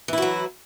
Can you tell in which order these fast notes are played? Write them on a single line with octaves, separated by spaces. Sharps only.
E3 E4 F#4 F#3